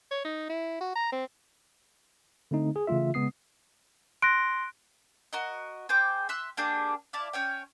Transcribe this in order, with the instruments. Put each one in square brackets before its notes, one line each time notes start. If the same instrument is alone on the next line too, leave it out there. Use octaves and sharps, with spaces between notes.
[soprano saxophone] C#5
D#4
E4
F#4
A#5
C4
[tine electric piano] D3 A3 C4 D#4
G#4
C#3 E3 A3 F4 E5
C#3 G#3 B3 D#6 C7
[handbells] C6 A#6 [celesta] F#6 D7
[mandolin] F#4 A#4 D#5
G#4 C5 G5 D6
E5 C6 E6 F#6
A#3 D4 G4 G#4
E4 D5 F5 A5
C#4 C#5 G5